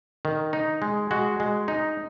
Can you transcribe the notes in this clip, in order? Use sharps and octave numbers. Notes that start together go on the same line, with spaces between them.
D#3
D#4
G#3
G#3 F#4
G#3
D#4